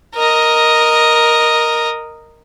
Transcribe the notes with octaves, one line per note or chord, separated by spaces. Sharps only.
A#4 D#5